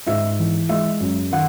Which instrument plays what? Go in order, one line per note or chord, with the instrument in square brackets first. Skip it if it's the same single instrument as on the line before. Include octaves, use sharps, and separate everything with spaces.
[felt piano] G#2 E5
E3
G#3 E5
F#2
D#3 F#5